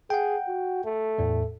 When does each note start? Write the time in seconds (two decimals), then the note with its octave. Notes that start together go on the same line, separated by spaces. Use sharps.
0.10 G#4 F#5 G5
0.48 F#4
0.85 A3
1.18 E2 A2